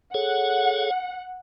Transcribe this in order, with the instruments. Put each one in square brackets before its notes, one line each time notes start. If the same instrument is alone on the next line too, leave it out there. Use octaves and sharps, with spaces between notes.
[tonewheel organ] G#4 A4 C#5 [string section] F#5